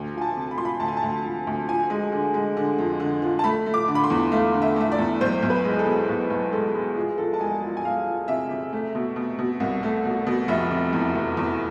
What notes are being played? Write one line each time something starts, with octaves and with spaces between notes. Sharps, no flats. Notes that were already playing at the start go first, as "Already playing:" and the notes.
Already playing: D2
F3 G#5
A5
C3
B5
F3 C6
B5
D2 A5
G#5
A5
D2
F3
D2
F3 G#5
G#3
D3
G#3
D3
F2
D3
F3
A5
A3 B5
A3
D6
D3
B5
C6
E2
A3 F5
D3
E5
A3 E5
D5
E2
B1 C5
B1
B4
G#3
G#4
A4
B2
B1
B1
G#3 A4
G#3
F3 G#4
F3 A4
A5
E1 G#5
F3
G#5
E1 F5
F3
C3 E5
C3
A3
B2
B2
B2
C2
A3
B2
B2
F1 E5
C3
E2
F1
E2